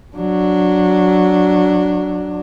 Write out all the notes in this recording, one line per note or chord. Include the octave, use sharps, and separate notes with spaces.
F#3 D4